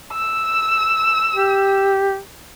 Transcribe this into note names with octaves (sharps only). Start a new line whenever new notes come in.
E6
G4